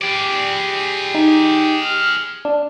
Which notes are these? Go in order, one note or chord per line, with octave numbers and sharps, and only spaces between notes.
G4 G#4 D5
D#4
F6
D4